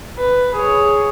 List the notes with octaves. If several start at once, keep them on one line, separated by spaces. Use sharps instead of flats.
B4
G#4 C#5